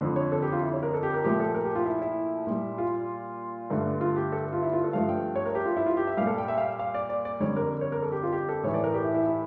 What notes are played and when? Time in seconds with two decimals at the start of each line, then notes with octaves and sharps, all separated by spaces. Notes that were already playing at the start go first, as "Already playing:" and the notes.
0.01 F2 D3 F3
0.16 C#5
0.32 A4
0.42 G4
0.52 F4
0.62 E4
0.73 C#5
0.83 A#4
0.94 A4
1.03 G4
1.14 A#4
1.24 A#2 F3 A3 G4
1.40 A4
1.54 A#4
1.65 G4
1.75 F4
1.86 E4
2.02 E4
2.47 A#2 G3
2.78 F4
3.70 G2 D3 A3
4.01 F4
4.16 G4
4.32 A4
4.53 F4
4.62 E4
4.73 F4
4.84 A4
4.93 G2 F3 A3 F5
5.09 G5
5.36 C#5
5.45 A#4
5.55 G4
5.66 F4
5.77 E4
5.86 F4
5.97 G4
6.07 E5
6.17 A#2 G3 F5
6.27 A4
6.38 G5
6.48 E5
6.58 F5
6.79 F5
6.94 D5
7.09 D5
7.25 D5
7.40 F2 D3 G3 C#5
7.56 A#4
7.81 C#5
7.92 A#4
8.02 A4
8.12 G4
8.23 F4
8.32 G4
8.49 A4
8.63 A2 E3 A3 C#5
8.74 D5
8.84 A#4
8.94 G4
9.05 E4
9.15 E4
9.26 E4